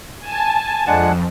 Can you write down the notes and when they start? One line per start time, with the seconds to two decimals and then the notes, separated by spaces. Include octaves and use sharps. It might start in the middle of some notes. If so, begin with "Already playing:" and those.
0.20 G#5 A5
0.87 F2 G#3 D4 F#5